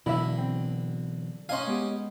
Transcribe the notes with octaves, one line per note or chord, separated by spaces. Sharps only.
B2 D3 E3 F#3 E4 D#5 E5 B5
C4
C#4 D#4 F5 G#5 C6
G#3 B3 G4